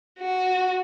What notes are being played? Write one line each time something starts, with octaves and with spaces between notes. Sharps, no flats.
F#4